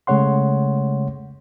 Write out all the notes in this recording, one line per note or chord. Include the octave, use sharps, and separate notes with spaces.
C#3 G#3 A3 C#5 F#5 C6